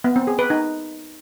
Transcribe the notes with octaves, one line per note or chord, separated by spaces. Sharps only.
B3
C4
G#4
B4
D#4